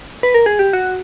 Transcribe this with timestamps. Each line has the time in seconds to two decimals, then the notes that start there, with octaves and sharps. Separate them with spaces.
0.23 B4
0.34 A#4
0.46 G#4
0.59 G4
0.73 F#4